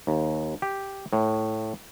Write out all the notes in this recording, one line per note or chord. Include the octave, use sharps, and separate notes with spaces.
D#2
G4
A2